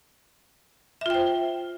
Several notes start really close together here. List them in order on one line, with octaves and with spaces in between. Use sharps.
E5 F4 G5 C5